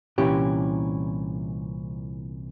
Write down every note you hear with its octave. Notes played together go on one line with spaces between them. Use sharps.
C2 A#2 E3 C#4 G4